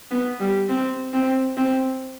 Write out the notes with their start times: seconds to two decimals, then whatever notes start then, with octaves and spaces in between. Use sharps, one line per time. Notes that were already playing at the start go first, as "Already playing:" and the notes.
0.11 B3
0.40 G3
0.69 C4
1.13 C4
1.57 C4